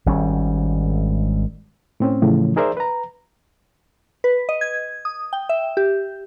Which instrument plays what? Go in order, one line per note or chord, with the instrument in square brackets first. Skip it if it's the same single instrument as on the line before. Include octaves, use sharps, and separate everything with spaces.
[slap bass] G#1 G#2 G3 C#4
[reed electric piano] A2 C4 C#4
A2 C#3 E3 F3
D#4 G#4 A#4 C5 D5 E5
B4 A#5
[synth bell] B4
D#5
G#6
D#6
G5
E5
G4